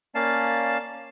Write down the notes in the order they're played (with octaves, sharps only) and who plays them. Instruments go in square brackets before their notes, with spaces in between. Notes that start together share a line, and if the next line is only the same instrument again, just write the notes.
[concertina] A#3 C#4 D5 F5 A5